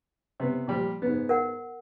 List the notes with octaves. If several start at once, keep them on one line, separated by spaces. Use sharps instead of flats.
C3 B3
A#2 F3 G3 D6
G#2 B3
A#4 F#5